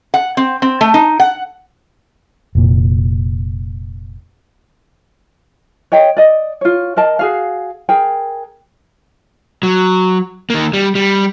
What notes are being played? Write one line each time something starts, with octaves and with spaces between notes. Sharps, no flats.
F#5
C4
C4
A3
D#4
F#5
F1 A#2
C#5 D#5 G5
D5 D#5
F4 C#5
A#4 D#5 A5
F#4 G#4 F5
G#4 A#4 G5
F#3
D#3 A#3
G3
G3